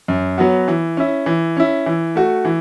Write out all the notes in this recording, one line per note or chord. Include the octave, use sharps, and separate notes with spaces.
F#2
F#3 B3 F#4
E3
C#4 E4
E3
C#4 E4
E3
A3 F#4
E3